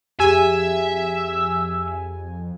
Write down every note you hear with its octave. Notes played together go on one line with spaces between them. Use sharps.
F2 G4 G#4 E5 G#5